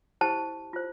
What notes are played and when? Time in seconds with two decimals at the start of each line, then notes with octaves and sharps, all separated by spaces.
0.21 E4 G4 C5 A5
0.73 F4 C5